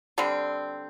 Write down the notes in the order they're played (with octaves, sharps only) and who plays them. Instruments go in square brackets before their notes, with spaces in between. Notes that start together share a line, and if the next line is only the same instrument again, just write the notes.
[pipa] D3 G3 C4